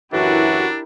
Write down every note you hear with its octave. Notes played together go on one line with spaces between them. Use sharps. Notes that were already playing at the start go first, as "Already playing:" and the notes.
F#2 A2 E3 D4 E4 F#4 G4 A#4